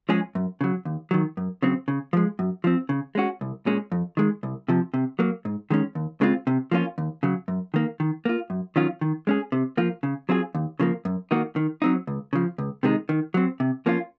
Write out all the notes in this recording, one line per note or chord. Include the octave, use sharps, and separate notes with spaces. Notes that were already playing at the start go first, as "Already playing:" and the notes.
F3 G#3 C#4 G#4
F#2
C#3 F#3
D#2
D#3 F#3
F#2
C#3 F#3 C4
C#3
F3 G#3
F#2
F3 C4
C#3
G#3 C#4 F#4
C2
A#2 G#3 C#4
F2
D#3 G#3
C2
C3 F3
C3
F#3 A#3
G#2
D#3 G#3 C#4
D#2
C#3 G#3 C4 F4
C3
F3 A#3 C#4 F4
D#2
C#3 F#3
F#2
D#3 A#3
D#3
A#3 F4
F#2
D#3 F#3 C#4 F4
D#3
G#3 C#4 G#4
C3
F3 A#3 F4
C#3
F#3 C4 F4 G#4
D#2
C#3 F3 A#3
F#2
D#3 A#3 D#4 F#4
D#3
F#3 C4 D#4
C#2
C#3 F3
C#2
C3 D#3 G#3 D#4
D#3
F#3 C4
C3
F3 A#3 C#4 F4